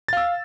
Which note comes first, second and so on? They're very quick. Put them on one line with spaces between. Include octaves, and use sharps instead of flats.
A6 F5 E6